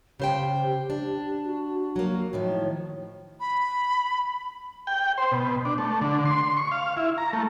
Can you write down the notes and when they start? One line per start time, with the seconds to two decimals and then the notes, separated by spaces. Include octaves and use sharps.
0.20 C#3 G4 C5 G5
0.90 D4
1.45 F#4
1.96 F#3 A#3
2.33 A2 D#3 F3 C#5
3.40 B5
4.87 G5
5.18 C5
5.32 B2
5.65 D4
5.78 A3
6.01 D3
6.25 C6
6.57 C#6
6.71 F5
6.97 E4
7.18 A#5
7.33 A3